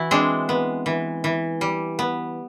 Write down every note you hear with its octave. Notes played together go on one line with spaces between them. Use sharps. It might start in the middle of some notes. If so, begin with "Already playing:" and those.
Already playing: E3 E4 F#4
G#3 C4 D4
B3
E3
E3
G3
B3